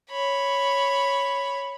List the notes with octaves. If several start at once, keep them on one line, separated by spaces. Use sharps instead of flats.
C#5 B5